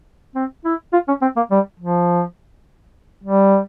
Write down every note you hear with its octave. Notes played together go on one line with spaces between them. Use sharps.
C4
E4
F4
C#4
C4
A#3
G3
F3
G3